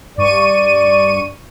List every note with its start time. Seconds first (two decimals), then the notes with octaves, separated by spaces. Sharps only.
0.18 G2 D5 C#6 D#7